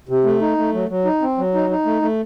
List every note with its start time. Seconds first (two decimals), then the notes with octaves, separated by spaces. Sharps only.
0.09 C3
0.25 A3
0.41 D#4
0.58 A3
0.74 F#3
0.89 F#3
1.05 D#4
1.22 C4
1.38 F#3
1.54 D#4
1.70 D#4
1.86 A3
2.02 A3